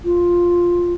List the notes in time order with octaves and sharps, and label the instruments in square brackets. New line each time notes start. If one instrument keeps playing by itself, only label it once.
[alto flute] F4